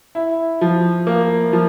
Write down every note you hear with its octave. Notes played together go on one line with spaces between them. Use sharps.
E4
F3
A#3
F3